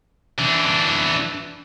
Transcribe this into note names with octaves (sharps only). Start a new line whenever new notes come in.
E3 D4